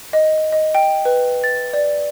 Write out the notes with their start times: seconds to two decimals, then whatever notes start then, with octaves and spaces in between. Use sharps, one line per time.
0.13 D#5
0.52 D#5
0.75 G5
1.05 B4
1.44 A6
1.73 D5